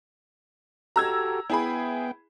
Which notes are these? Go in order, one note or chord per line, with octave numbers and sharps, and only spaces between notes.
F#4 G4 A4 A#5 E6 G#6
B3 E4 G#4 G5 B5